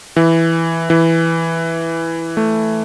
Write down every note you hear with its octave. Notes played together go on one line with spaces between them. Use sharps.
E3
E3
A3